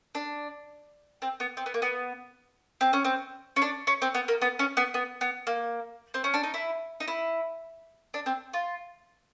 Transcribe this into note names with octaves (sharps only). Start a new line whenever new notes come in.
D4
C4
B3
C4
B3
A#3
B3
C4
C#4
C4
C#4
D4
C#4
C4
B3
A#3
B3
C#4
B3
B3
B3
A#3
C4
C#4
D4
D#4
E4
D#4
E4
D4
C4
F4